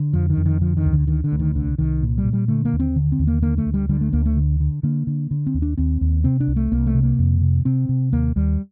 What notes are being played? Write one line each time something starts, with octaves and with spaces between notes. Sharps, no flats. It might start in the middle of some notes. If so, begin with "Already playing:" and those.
Already playing: D3
F2 F3
D#3
F2
D#3
D3 F3
D#3
D2
D3
D3 D#3
D3
D2
D#3
C2 D3
C2 D#3
A#2
G3
A#2
G3
D3 A3
A#3
D#2
C4
D3
C4
D#2
A#3
D3 A#3
A3
D2
G3
D3 G3
A3
D2 A#3
A3
D3
D3
D3 A#3
D3
D3
C4
D#2
D4
D#2 C4
D#2
C3 C4
D4
C2
A3
C2 A#3
A3
C3
A#3
F2
C3
C3 C4
C3
D#2 A#3
D#2 G3